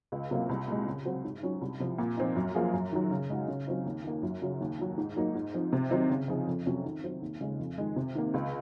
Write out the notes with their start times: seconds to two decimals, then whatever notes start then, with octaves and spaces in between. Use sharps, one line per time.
0.12 C#2
0.31 C3 F#3 A#3 F4
0.49 C2
0.68 A#2 G#3
0.86 C#3
1.05 F#3 C4 F#4
1.24 G#2
1.43 F#3 C#4
1.61 C2
1.80 C3 F3
1.99 A#2
2.17 F3 C4 D#4
2.36 F#2
2.55 F3 A#3 F4 G#4
2.73 F#2
2.92 D#3 F#3
3.11 C#3
3.30 G#3 D#4 F#4
3.48 C#3
3.67 F#3 C4 D#4
3.86 D#2
4.04 D#3 A#3
4.23 F#2
4.42 C#3 F#3
4.60 D#2
4.79 D#3 F#3
4.98 G#2
5.16 F#3 A#3 D#4
5.35 G#2
5.54 F3 C4
5.73 C3
5.91 D#3 F#3 C4 D#4
6.10 C#3
6.28 F3 C4 D#4 G#4
6.47 F2
6.66 C3 F#3 C#4
6.85 D#3
7.04 F#3 C4
7.22 D#2
7.41 C#3 G#3
7.59 F2
7.78 D#3 G#3
7.96 C3
8.15 D#3 A#3
8.34 C#2